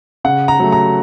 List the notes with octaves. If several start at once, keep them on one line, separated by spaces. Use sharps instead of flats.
C#3 F#5
A#5
F#3 A3
A#5